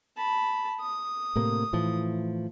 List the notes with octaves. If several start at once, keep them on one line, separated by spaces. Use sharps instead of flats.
A5 B5
D#6
A2 C3 A#3
A2 E3 F3